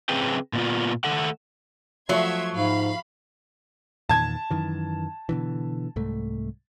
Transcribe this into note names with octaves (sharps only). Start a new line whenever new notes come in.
C#3 C4 G#4 B4 G5
A#2 B3 F4
D#3 A3 A4 F#5
F3 F#3 A3 E5 C6 G#6
G#2 F5 B5
E2 A#2 D#3 A5 G#6
F#2 D#3 E3
B2 D3 E3
C2 G#2 A3